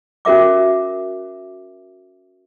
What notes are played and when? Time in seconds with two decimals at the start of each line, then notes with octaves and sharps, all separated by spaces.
0.25 C#4 F#4 A#4 E5 D6